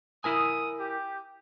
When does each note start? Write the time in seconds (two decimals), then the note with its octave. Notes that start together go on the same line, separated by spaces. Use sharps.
0.24 E4 A#4 G#5 D#6
0.79 G4